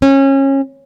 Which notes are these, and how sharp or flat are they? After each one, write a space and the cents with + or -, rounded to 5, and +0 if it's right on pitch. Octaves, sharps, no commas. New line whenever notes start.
C#4 -25